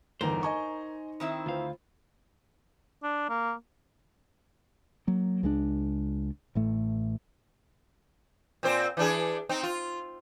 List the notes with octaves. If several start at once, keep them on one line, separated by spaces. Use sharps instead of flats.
G1 E2 D#4 A#4 C5
D#5 G#5 C#6
D#3 C4 E4
D2 F4 C5 F5
D4
A#3
F#3 A#3
C#2 G#3 C4 D4
A1 A2 A3
A#2 C4 C5
E3 D4 G#4
C4 D#4
F4